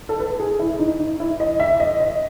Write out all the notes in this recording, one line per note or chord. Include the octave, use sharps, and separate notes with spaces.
A4
B4
G#4
E4
D#4
D#4
E4
D#5
E5
D#5
D#5